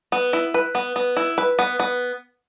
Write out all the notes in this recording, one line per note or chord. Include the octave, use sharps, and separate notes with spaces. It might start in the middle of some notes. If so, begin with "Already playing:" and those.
B3
E4
B4
B3
B3
E4
B4
B3
B3